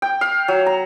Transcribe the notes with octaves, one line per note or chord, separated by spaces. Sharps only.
G5
F5
F#3
A#5